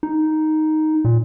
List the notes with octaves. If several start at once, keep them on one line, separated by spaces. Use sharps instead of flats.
D#4
A#2